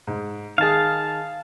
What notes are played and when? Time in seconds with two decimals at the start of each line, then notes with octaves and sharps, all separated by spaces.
0.07 G#2
0.58 D#3 G#4 F5 A5